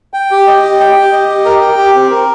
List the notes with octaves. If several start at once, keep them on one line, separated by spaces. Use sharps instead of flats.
G5
G4
D#5
G4
G5
G4
D#5
G4
A#4
G5
G4
C4
A#4